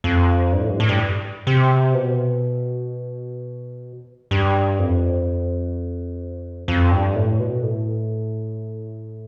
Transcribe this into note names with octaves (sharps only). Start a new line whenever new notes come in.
F2
G2
A2
G2
A2
G2
C3
B2
G2
F2
F2
G2
A2
B2
A2